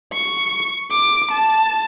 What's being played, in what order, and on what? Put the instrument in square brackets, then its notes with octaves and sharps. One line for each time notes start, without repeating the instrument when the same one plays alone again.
[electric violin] C#6
D6
A5